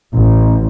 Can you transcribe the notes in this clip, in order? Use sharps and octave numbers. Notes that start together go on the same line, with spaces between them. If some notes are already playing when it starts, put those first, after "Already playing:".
A1